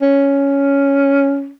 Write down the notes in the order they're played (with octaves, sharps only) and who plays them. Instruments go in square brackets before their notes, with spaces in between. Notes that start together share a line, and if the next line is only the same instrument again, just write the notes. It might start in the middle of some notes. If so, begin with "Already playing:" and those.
[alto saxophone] C#4